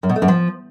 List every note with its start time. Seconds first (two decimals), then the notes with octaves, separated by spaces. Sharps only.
0.03 F#2
0.09 B2
0.16 A3
0.22 F#2
0.28 F3